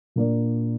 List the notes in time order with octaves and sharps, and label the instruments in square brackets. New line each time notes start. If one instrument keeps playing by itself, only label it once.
[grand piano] A#2 A#3 D4 A#4 D5